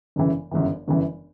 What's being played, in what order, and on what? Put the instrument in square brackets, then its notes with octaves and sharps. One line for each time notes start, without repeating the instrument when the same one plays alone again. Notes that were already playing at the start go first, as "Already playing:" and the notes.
[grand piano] G1 F#2 C#3 E3
G1 F#2 C#3 E3
G1 F#2 C#3 E3